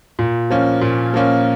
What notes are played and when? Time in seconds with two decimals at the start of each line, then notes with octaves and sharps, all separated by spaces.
0.19 A#2
0.51 F3 A#3 C#4
0.81 A#2
1.14 F3 A#3 C#4